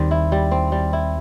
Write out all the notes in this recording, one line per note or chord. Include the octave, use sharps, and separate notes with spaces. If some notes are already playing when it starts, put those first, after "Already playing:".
Already playing: D#2 D#3 G3 C4
E4
G3
C4
G3
E4